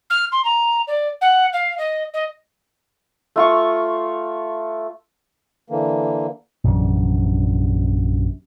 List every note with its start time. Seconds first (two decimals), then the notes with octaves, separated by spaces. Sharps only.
0.10 F6
0.32 C6
0.45 A#5
0.87 D5
1.21 F#5
1.53 F5
1.78 D#5
2.14 D#5
3.36 A3 F4 C#6
5.70 D3 E3 A#3
6.64 A#1 F#2 C3 E3